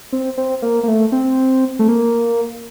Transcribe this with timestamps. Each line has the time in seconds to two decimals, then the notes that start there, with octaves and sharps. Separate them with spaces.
0.13 C4
0.37 C4
0.62 A#3
0.83 A#3
0.88 A3
1.12 C4
1.79 A3
1.88 A#3